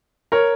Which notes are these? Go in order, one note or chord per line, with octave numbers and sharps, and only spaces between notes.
A#4 C#5